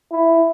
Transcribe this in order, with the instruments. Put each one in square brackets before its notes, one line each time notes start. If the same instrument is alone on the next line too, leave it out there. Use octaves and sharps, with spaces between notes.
[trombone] E4